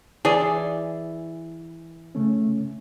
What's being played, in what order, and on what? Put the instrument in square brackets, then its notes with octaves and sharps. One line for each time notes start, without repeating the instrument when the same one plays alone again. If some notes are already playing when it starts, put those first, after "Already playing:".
[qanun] E3 [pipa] G#4 D5
[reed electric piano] C#3 A3 C#4